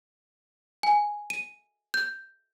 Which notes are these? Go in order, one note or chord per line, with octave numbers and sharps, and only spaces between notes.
G#5
D#7
G6